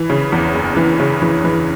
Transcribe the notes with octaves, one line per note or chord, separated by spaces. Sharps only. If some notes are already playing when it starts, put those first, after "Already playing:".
Already playing: E3
C#3
E2
F#1
E3
C#3
E3
E3